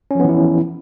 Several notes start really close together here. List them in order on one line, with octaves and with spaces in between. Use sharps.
C#4 F3 B3 E3 E4